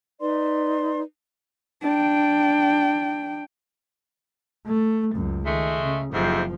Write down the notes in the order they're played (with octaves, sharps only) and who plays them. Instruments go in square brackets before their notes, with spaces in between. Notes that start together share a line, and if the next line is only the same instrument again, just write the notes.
[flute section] D#4 B4 D5 C6
[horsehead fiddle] D4 G5
[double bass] A3
C#2 F#2
[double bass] D#3 [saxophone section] G#3 A3
[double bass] C#3
[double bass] F#1 F3 [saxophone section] F2 G#2 C3